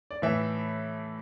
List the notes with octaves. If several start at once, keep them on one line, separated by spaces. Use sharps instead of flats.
D5
A2 E3 E5